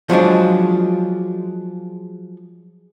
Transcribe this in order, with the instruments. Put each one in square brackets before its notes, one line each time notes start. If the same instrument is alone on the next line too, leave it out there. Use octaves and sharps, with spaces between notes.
[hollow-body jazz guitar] F3 F#3 G#3 D4